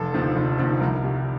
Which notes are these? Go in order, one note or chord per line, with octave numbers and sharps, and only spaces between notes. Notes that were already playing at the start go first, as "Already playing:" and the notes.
Already playing: F1 A4
D#2 D3 F3
F1
D#2 D3 F3
C2 A#4
C3 G3